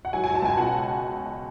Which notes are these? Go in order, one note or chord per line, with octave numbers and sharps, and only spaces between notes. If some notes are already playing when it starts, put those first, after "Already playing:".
F#5
F#3 G#5
F#3 G#5
A5
C#2 G#5
B2 F#5